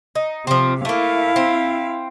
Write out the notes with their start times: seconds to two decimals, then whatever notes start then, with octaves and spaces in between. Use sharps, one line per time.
0.15 D#4
0.47 C3 F3 C4
0.85 A3 A#3 E4 F5
1.36 C4